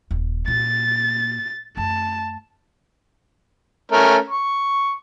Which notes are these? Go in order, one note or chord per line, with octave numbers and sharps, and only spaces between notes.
D#1
A#2 A6
F#2 A3 A5
A3 C#4 A#4
C#6